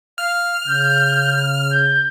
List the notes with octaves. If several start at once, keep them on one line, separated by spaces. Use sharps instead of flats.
F5 F6
C#3 G6
G6